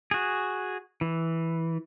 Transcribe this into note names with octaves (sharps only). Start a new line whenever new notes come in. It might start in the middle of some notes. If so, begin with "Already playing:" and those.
F#4 G#4
E3